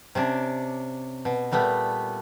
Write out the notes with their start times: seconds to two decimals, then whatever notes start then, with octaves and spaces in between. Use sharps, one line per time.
0.15 C3 C#4 D4
1.25 B2
1.52 A#2 G3 A3 B3